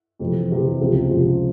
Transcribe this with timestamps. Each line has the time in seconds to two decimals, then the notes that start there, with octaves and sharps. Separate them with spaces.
0.19 F2 C3 E3
0.50 F2 C3 E3
0.81 C#2 C3 F3
1.10 C#2 C3 F3